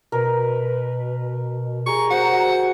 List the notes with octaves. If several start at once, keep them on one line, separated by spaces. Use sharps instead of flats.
B2 A#4 B4
G4 G#4 A#5 C#6
F#4 C5 F#5